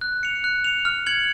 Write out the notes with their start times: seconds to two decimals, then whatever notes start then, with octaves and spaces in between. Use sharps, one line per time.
0.01 F#6
0.23 C#7 F7
0.44 F#6
0.64 C#7 F7
0.85 F6
1.06 G#6 C#7 F#7